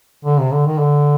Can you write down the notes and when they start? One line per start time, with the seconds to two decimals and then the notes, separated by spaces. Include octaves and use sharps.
0.25 D3
0.40 C3
0.53 D3
0.66 D#3
0.78 D3